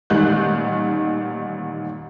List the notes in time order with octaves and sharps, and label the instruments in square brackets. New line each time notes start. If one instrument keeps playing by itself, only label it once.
[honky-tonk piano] A1 A#2 D#3 G3 F#6 G6